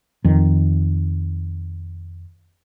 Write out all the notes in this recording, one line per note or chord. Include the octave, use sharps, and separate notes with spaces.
F2 D#3